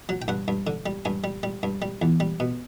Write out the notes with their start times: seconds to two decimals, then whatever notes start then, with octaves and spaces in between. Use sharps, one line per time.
0.09 F#3
0.22 G5
0.28 G2 F#5
0.48 G2
0.67 D3
0.86 G3
1.05 G2 G#5
1.24 G3
1.43 G3
1.63 G2
1.82 G3
2.02 E2
2.20 G3
2.40 B2